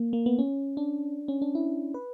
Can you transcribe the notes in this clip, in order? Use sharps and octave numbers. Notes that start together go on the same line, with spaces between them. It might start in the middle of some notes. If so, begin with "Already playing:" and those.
Already playing: A#3
A#3
B3
C#4
D4
C#4
D4
E4
B4